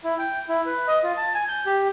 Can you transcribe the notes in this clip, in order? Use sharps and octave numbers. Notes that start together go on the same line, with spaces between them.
E4
G5
E4
B4
D#5
F4
A5
G#5
G6
G4